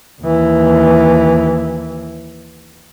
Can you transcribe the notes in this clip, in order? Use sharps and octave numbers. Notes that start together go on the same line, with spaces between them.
D#2 E3